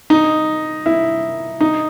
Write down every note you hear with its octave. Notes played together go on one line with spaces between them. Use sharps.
D#4
E4
D#4